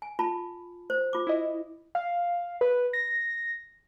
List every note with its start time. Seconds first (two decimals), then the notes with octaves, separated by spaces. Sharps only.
0.02 G#5
0.19 F4 A5 B5
0.90 C5
1.13 F4 D6
1.27 E4 D#5
1.95 F5
2.61 B4
2.93 A#6